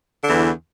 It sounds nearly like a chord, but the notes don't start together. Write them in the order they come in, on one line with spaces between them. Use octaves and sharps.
D3 E3 E2